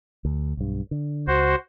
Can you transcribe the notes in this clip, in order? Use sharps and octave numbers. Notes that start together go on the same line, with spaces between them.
D2
B1 G2
D3
C#2 F#4 C5